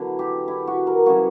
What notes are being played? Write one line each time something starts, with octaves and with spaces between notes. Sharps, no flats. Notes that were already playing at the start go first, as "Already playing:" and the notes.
Already playing: D3 F#3 B3 E4
G4
E4
F#4
A#4
C#3 E3 G3 F#4